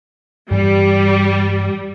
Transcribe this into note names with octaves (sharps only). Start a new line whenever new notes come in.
G2 E3 G3 A#3